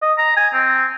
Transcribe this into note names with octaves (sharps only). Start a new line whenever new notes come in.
D#5
A#5
G#5
C4